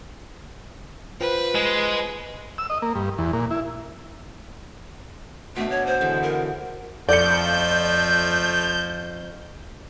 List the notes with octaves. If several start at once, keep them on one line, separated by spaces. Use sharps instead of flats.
F4 B4 C5 G5
G#3
E6
D#5
A#3
G2
E2
A#2
E4
B2 A3 D4
C#5
C5
D3 E3 G#3
A#4
F2 F3 A3 D5 G6 C#7